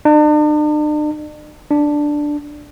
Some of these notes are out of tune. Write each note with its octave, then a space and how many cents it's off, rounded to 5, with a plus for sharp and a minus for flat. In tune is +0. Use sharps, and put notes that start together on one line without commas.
D4 +45
D4 +5